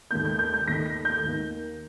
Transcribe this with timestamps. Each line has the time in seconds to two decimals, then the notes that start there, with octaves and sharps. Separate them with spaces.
0.11 D#2 D#3 A#3 G6
0.25 G6
0.39 G6
0.54 G6
0.67 D#2 D#3 A#3 A#6
0.86 A#6
1.05 G6
1.23 D#2 D#3 A#3